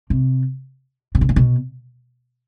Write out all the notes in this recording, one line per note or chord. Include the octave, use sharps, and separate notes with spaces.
C3
C3
B2
A#2
B2